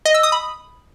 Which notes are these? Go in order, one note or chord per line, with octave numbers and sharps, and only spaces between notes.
D#5
E6
D#6
B5